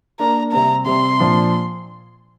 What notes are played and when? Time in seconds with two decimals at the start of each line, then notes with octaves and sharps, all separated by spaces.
0.20 A#3 D4 A#4 A#5
0.52 C3 G3 C4 A#5
0.86 C3 G3 C4 C6
1.20 A#2 F3 D4